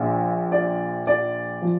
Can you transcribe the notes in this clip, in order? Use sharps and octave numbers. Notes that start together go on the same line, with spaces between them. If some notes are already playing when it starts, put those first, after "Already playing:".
Already playing: A#1 A#2
D5
D5
F3